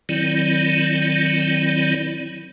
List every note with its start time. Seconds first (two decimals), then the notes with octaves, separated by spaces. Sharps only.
0.09 D#3 F#3 C4 E4 D5